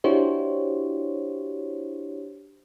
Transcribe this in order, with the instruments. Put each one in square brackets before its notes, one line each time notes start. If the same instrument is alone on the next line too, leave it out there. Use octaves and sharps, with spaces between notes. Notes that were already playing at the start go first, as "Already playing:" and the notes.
[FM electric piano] D4 E4 F#4 G4 C5 C#5